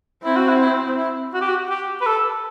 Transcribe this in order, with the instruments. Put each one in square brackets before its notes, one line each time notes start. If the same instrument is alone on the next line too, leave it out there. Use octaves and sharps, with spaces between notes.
[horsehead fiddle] C4 [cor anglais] E4
[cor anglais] F#4
E4
E4
E4
F#4
G4
F#4
G4
B4
A4